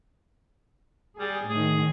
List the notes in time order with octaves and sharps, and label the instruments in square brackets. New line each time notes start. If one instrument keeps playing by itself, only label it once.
[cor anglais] G3 [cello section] G#4
[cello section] A2 D#3 [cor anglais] G#4